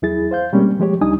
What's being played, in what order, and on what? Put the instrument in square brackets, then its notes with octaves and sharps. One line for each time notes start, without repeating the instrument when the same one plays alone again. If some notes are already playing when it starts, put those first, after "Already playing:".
[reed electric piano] E2 F#3 E4 G#4 A6
C5 F5 G6
B2 G3 G#3 A#3 C4 C#4
F3 G#3 G4 C#5
C#2 G3 D4 D#4 G#5 D#6